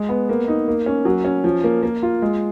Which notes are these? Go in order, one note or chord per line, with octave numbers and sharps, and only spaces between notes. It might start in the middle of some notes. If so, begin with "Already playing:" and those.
Already playing: G#3
B3
A#3
D#4
A#3
C#4
F#3
C#4
F3
A#3
A#3
F4
G#3